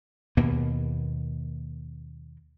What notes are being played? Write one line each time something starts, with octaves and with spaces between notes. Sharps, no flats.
D#2 B2 A#3 B3